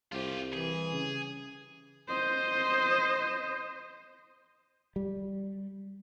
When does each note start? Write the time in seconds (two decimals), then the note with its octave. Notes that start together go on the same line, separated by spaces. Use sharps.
0.12 C2 F4 G4
0.53 E3 G#4
0.93 C#3
2.08 C5 D#5
4.96 G3